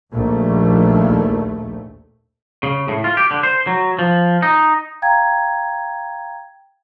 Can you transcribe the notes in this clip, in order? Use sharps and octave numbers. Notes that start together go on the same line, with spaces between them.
A#1 D#2 A3
C#3
A2
F4
G4
D3
C5
F#3
F3
D#4
F5 G5 A#5 G#6